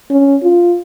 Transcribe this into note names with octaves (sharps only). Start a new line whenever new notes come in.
C#4
F4